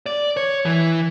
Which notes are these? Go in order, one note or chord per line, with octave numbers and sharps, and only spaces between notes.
D5
C#5
E3